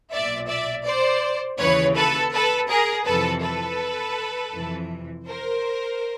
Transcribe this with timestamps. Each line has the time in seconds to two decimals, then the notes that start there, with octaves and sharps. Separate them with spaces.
0.12 B1 A#2 D5 E5
0.48 D5 E5
0.85 C5 D5
1.59 D#2 C#3 E3 B4 C#5
1.96 A4 B4
2.33 A4 B4
2.69 G#4 A#4
3.06 F2 C3 E3 A4 B4
3.43 A4 B4
4.54 F2 C3 E3
5.27 A#4 C5